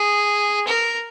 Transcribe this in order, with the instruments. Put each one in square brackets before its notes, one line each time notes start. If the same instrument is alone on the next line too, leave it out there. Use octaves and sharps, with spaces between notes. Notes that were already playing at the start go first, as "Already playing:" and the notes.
Already playing: [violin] G#4
A#4